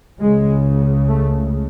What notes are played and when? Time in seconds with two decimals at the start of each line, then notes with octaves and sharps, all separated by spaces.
0.19 C#2 C#3 G#3
1.09 A3